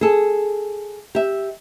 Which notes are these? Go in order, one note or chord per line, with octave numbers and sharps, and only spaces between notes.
G#4 A4
G4 E5